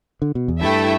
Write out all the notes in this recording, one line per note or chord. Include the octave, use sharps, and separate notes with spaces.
D3
B2
E2
G2 A3 E4 A4 E5 G5